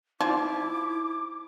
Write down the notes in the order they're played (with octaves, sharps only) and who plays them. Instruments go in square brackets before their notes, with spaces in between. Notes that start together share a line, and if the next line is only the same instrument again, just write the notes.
[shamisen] F3 [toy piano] D#4 [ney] E4 [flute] D6